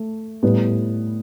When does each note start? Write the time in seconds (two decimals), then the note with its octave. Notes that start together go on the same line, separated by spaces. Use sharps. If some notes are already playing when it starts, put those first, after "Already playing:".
Already playing: A3
0.43 A2 G3 B3